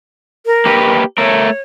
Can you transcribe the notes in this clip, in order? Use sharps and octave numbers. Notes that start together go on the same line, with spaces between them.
A#4
A#3 G4 B4
A3 A#4 C#5